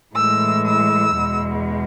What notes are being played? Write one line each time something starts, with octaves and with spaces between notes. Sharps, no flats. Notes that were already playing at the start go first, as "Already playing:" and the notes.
A2 E3 G#3 E6
E6
E2 B2 G#3